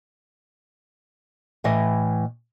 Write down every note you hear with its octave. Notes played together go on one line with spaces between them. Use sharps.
A2 E3 D#5